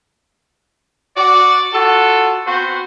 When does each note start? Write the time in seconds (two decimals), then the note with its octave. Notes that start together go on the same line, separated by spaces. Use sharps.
1.17 F#4 D5
1.73 F4 F#4 A4
2.47 B3 C4 F#4 C5